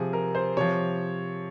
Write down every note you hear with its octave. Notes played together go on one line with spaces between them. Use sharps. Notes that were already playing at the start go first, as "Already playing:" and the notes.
Already playing: C3 F3 G#4
A#4
C5
C3 F3 C#5